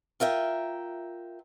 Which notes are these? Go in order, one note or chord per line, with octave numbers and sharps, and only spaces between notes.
F4 A#4 E5 G5